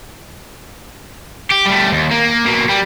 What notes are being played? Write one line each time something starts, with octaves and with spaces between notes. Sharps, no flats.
G4
G3 A3
D#2
A#3
B2 A#3
G3